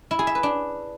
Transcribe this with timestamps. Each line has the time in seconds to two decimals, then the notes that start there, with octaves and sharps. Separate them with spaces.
0.11 E4
0.19 G#4
0.27 E5
0.35 B4
0.43 D4